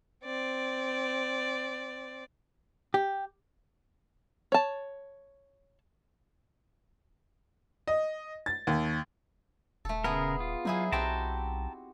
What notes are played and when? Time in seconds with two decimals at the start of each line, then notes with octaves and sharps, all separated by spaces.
0.24 C4 D5
2.94 G4
4.52 C#5 A5
7.88 D#5
8.46 A6
8.67 D#2
9.85 D#1 A3 A4
10.04 C#3 B3 G#4 A#4
10.40 F4
10.65 F#3 D#4 E4 G#4
10.92 B1 C4 F#4 G4 G5 A5 A#5